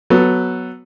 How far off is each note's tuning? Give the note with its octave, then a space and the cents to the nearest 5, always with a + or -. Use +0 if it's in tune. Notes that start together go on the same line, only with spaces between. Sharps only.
F#3 +0 B3 +0 A4 +0